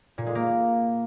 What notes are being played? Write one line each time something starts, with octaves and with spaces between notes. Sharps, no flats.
A#2
G#3
A#3